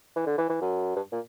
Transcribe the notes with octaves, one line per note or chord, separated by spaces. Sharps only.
E3
D3
E3
E3
F#2
G2
A#2